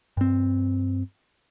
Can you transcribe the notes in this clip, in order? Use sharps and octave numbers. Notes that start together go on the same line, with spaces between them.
G2 C4